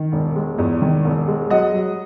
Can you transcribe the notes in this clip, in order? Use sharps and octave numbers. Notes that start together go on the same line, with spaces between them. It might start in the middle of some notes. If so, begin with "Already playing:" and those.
Already playing: D#3
E1
G#3
E2
D#3
E1
G#3
F#3 D#5 F#5
F#3